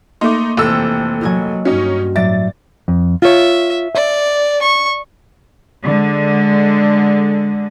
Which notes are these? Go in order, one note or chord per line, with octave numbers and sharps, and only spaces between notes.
A3 A#3 D#4 C6 D6
F1 E3 C4 A4 E6
F#3 A#4 D#5 G#5
G2 C#4 D#4 F#4
A2 F#3 D5 E5 A6
F2
F4 C#5 E5
D5 E5
C#6
D3 G#3